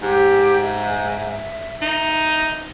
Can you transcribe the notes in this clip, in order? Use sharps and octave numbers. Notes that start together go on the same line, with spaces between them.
G#2 G4
E5
D#4